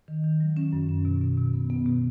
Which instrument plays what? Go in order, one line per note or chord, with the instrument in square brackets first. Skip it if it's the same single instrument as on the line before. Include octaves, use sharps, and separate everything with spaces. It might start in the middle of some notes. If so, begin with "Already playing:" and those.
[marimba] D#3
D#3
F#3
C#4
F#2
C#4
B2
B2
B2
B3
B3
B2